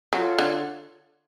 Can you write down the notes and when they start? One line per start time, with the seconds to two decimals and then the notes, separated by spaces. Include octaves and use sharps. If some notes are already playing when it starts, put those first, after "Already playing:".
0.12 F#3 F4 A4 C#5
0.39 D3